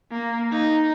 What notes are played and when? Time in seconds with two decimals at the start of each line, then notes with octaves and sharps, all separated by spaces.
0.12 A#3
0.52 D#4